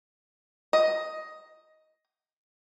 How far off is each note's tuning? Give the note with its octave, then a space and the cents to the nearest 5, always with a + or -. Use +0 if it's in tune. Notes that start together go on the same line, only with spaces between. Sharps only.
D#5 +10